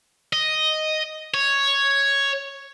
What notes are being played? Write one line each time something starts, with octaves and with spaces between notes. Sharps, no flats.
D#5
C#5